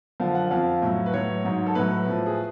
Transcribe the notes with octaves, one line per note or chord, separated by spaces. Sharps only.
F#2 D3 F3 F5
F#5
F2 F3 F5
A2 F#3
B4
A2 F#3 C#5
G#2 F#3
A4
A2 F#3 B4
A2 F3
G#4